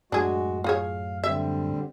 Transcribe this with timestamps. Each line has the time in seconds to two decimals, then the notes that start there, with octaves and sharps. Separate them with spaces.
0.12 F#2 A2 G#3 D4 F#4 G#4
0.64 F4 G#4 C#5 F5
1.24 D3 G3 C4 E5